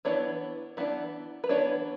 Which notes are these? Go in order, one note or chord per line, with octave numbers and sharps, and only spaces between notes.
E3 B3 D4 C#5
E3 B3 D4
B4
E3 B3 D4 C#5